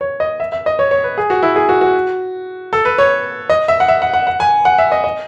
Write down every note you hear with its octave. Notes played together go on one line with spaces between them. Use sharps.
C#5
D#5
E5
E5
D#5
C#5
C#5
B4
G#4
F#4
E4
G#4
F#4
F#4
A4
B4
C#5
D#5
E5
F#5
E5
F#5
F#5
F#5
G#5
F#5
E5
D#5
D#5